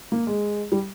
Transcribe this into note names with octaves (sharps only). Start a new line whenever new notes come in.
A#3
G#3
G3